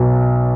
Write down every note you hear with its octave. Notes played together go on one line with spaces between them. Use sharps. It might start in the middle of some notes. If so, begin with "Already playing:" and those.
Already playing: B1 B2 F#3